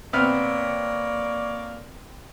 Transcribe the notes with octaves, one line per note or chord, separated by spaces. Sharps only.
C3 A#3 B3 C#5 D5 F6